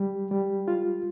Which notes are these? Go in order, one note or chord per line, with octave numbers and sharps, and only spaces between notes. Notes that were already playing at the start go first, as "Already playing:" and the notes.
Already playing: G3
G3
F4